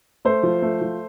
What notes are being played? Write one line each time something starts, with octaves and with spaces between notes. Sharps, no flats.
A3 C5
F3
A3
F3